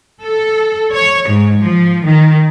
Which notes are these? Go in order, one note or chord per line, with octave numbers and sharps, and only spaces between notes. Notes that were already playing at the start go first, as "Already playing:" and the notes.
A4
C#5
G#2
F3
D#3